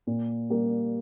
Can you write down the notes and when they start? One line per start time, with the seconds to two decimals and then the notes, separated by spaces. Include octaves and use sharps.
0.07 A#2
0.50 G3 A#3 G4